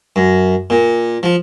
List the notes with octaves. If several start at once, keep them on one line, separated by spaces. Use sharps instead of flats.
F#2
A#2
F3